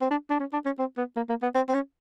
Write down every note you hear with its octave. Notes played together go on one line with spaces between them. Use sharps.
C4
D4
D4
C#4
D4
C#4
C4
B3
A#3
A#3
B3
C4
C4
C#4